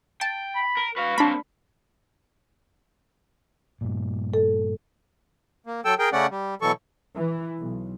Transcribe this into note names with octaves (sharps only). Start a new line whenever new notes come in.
G5 A5
B5
A#4
F#4 B4 F5
A#3 C4 D4 B5
G2 A#2
A4
A#3
F#3 A4 G5 E6
G#4 A#4 G5
C#3 A3 C#4 D5 F#5
G3
B2 E3 F#3 A4 C#6
E3
B1